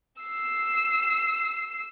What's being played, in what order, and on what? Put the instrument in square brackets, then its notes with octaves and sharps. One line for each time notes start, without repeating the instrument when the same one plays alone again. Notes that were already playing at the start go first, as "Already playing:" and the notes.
[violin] E6 C7